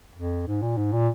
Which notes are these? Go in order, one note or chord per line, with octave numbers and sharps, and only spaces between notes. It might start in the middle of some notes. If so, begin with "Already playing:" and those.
F2
G#2
A#2
G#2
A#2